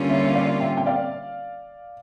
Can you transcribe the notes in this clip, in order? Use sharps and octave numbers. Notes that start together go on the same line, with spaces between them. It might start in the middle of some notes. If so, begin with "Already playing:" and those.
Already playing: D3 G3 A#3 C#4 F4
C#5 E5
D5 F5
E5 G5
G5
D5 F5